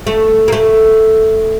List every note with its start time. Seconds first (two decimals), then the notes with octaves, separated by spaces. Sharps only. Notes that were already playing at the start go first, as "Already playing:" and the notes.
0.07 A3
0.48 A#3
0.52 A3